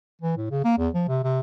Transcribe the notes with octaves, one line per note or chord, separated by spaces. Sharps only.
E3
A2
C#3
A#3
E2
F3
C3
C3